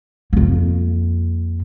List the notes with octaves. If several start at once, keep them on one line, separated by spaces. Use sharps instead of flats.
F2 A#3